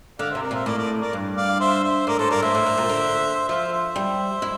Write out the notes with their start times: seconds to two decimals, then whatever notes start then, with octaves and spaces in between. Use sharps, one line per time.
0.19 D3 D5 F5
0.31 C3 C5 E5
0.42 A#4 D5
0.51 A#2 C5 E5
0.66 A2 A#4 D5
0.78 A#4 D5
1.01 A#4 D5
1.13 G2
1.37 D5 F5
1.60 C5 E5
1.84 C5 E5
2.07 A2 A#4 D5
2.19 A2 A4 C5
2.31 G2 A#4 D5
2.42 A2 C5 E5
2.55 A2
2.66 A2
2.77 A#2
2.89 D3
3.49 F3 C5 E5
3.72 C5 E5
3.96 G3
4.42 E4